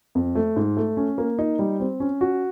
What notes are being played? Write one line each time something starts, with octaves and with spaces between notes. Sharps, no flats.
F2
A3
G#2
A3
C#4
A#3
D#4
G3
C4
C#4
F#4